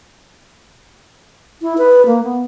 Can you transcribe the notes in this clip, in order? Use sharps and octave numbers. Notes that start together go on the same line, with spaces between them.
E4
B4
A#3
B3